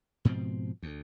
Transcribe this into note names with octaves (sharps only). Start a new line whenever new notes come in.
G#2 B2 F3 C4
D2